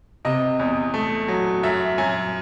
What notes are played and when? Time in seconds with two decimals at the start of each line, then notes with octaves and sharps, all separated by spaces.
0.25 C3 D#5
0.60 E2
0.94 A3
1.28 F#3
1.63 F#2 E5
1.98 F#2 G#5